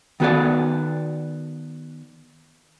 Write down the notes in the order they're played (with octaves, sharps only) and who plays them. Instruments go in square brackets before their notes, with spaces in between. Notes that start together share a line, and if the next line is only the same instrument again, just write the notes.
[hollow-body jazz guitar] D#3 B3 F#4 A4 B4 D5